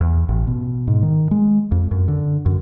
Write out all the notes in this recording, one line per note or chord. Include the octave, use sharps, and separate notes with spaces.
E2
A1
B2
G#2
D#3
G#3
F2
F#2
D3
F#2